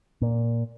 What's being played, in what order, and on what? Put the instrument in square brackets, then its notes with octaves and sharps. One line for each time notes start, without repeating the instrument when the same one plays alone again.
[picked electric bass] A#2